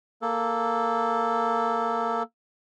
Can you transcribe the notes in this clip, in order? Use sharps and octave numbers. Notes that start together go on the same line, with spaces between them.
A#3 A4